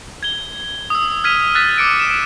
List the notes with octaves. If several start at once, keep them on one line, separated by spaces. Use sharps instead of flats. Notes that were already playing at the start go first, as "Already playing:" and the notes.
G#6 G7
D#6 E6
F6 G#6 B6 D#7
E6 F#6 A6 B6
D6 C#7 D7
E7